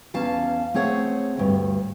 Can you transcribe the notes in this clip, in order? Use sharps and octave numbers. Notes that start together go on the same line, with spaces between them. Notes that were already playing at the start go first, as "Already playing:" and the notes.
E2 C#4 F5 A5
A3 C4 G#4 C#5 F#5
D2 G2